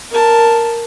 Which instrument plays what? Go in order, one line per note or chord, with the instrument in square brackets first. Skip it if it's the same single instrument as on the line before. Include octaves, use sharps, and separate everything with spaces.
[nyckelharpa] A#4 A5